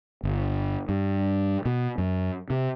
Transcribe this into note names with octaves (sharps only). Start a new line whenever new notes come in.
G1
G2
B2
F#2
C3